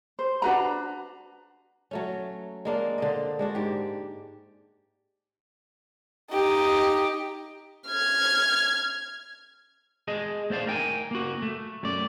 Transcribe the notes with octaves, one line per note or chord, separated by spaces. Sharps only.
C5
D4 F#4 B4 A#5
F#3 A3 C#4
G#3 A#3 D4
D3 C5 D#5
G#3 D4 F#4
G#2 G4
D#4 G4
F6 G#6
G#4 D#5 A5
A3 C5 D5 F5 A5
A#4 G5 G#5
A#3 F#4
A3
F#2 D5